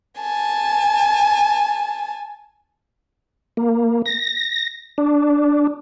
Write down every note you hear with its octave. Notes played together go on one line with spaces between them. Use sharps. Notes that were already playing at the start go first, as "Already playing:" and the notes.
G#5 A5
A#3
A#6
D4